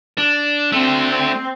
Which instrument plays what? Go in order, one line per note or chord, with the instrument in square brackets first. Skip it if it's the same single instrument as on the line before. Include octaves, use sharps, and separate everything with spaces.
[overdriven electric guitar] D4
[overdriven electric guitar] A3 D4 [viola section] C4